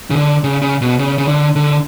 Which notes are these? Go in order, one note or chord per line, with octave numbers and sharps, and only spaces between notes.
C#3
D3
C#3
C#3
B2
C#3
C#3
D3
D3